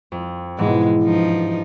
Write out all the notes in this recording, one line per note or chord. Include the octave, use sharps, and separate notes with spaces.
F2
G#2 B2 E3 G#3
G2 F3 D#4